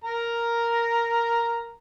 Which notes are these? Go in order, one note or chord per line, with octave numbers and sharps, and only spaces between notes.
A#4 A#5